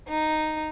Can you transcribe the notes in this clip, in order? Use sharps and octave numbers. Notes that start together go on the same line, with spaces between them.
D#4